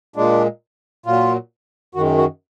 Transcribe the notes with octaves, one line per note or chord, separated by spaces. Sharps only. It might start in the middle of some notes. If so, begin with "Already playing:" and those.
A#2 G#3 D4
A#2 F#3 F4
F#2 D#3 G#3 F#4
F#4